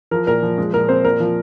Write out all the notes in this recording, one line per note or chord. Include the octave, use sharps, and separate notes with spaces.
F3 A#4
A#2 A#4
F3
G#3
A#2 A#4
C4 C5
A#2 A#4
F3